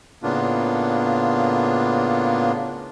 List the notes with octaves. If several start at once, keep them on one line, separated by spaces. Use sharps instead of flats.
A2 C#3 A#3 B3 D4 F4